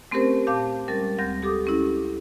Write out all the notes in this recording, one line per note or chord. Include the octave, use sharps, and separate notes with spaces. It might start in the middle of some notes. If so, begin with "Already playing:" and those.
A3 C4 C#4 G4 A#4 C5
A#2 F5 A5 D6 G6
G3 G#3 C#4 A#4 A6
D2 G3 C4 G6 A#6
G4 A4 D6 D#6
G3 C#4 E4